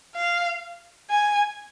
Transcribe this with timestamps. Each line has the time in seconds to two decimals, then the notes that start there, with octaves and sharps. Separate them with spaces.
0.16 F5
1.10 G#5